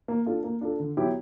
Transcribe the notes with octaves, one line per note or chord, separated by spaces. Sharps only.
A#3
D4 F4 A4
A#3
D4 F4 A4
D3
F#3 B3 E4 G4